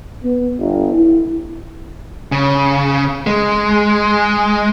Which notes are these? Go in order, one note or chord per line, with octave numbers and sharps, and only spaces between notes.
B3
G1
E4
C#3
G#3